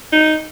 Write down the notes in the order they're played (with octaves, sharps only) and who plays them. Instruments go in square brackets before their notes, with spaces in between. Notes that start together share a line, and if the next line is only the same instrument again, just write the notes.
[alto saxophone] D#4